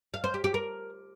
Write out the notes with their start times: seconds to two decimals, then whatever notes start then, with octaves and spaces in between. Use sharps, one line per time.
0.14 F5
0.24 C5
0.34 G4
0.44 G4
0.54 A#4